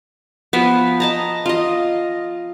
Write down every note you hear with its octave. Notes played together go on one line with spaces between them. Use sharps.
F3 B3
D#5 A5 A#5
F4 D#5